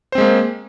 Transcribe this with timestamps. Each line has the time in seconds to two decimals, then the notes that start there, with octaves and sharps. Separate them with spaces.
0.12 C5
0.15 C4
0.18 G#3
0.21 A#3